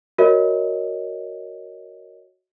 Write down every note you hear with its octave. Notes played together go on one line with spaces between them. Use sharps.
F#4 A#4 C#5 D#5 E5